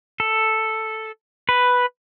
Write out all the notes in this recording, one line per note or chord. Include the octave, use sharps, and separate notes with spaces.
A4
B4